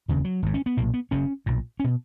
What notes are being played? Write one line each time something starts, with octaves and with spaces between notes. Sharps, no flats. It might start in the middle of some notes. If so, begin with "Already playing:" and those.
F1 D#2 C#3
F#3
G#1 G#2
C#4
B3
B1 A#2 A#3
B3
F#1 F#2 C#3 C#4
B1 A#2
C#4
B2